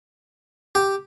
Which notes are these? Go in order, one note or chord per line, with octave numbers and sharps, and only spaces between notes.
G4